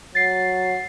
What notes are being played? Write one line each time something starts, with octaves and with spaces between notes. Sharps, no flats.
F#3 A6 C7